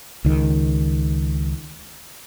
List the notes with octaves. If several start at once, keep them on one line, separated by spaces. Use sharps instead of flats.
C#2 D#3